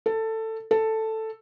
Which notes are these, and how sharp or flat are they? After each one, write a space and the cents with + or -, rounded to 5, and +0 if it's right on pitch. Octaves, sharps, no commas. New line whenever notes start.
A4 +15
A4 +5